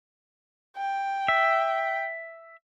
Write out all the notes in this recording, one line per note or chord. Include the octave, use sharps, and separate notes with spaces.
G5
E5